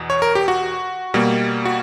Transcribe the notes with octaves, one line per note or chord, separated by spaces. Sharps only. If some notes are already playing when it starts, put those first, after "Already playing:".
Already playing: E2 B2
C#5
A#4
G4
F#4
B2 G3 A#3
F#4